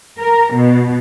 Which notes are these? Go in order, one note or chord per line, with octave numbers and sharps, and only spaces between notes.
A#4
B2